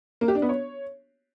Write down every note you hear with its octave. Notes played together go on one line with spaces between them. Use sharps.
A#3
G4
D4
B3
C#5